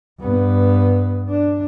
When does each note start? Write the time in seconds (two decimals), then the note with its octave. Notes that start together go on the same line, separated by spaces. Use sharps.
0.20 G2 B3
1.29 D4